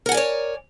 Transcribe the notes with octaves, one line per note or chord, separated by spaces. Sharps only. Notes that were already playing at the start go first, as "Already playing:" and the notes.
A#4 C#5 D5 F#5 G#5